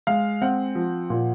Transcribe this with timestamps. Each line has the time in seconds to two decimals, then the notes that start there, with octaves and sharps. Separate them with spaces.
0.07 G#3 F5
0.42 C4 F#5
0.75 F3
1.10 A#2